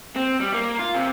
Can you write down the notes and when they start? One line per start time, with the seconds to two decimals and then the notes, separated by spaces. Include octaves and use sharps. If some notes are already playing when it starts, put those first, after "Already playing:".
0.16 C4
0.40 G3
0.54 A#3
0.79 F4
0.95 C3